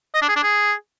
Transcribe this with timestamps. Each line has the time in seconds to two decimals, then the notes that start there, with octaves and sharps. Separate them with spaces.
0.15 D#5
0.22 D4
0.29 G#4
0.36 D4
0.43 G#4